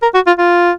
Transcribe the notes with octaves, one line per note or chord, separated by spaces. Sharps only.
A#4
F#4
F4
F4